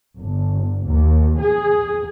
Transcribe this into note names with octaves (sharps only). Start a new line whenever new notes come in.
G1
D#2
G#4